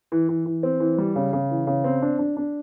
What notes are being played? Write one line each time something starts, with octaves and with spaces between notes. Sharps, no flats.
E3
E3
E3
C4
E3
G3
C#3
C#3
E3
C#3
C4
D4
D4
D4